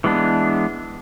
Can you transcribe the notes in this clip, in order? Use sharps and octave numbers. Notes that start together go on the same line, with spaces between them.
E3 G#3 B3 D4